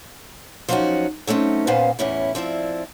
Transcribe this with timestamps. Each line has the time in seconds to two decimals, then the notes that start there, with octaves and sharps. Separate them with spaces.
0.69 F3 F#3 B3 C#4 D#4 F#4
1.27 F#3 A3 C4 C#4 D#4
1.67 A#2 B3 C#4 C5 F5
1.99 E2 A2 C#4 E4
2.35 F3 C4 E4 D5